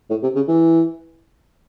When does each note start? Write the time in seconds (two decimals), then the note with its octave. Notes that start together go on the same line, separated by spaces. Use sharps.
0.10 A2
0.23 C3
0.35 C#3
0.48 E3